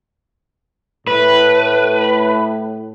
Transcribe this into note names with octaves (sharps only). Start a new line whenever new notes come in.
A2 B4